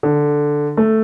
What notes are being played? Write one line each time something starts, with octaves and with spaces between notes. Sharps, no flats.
D3
A3